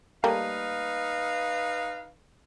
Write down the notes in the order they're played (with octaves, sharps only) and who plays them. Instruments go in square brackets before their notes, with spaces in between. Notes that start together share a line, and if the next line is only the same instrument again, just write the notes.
[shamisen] G3 A3 A#3 [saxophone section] D#4 B4 F5